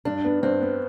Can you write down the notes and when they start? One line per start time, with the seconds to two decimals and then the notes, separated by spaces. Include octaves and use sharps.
0.05 G2 D4
0.25 B3
0.43 G2 C4
0.62 B3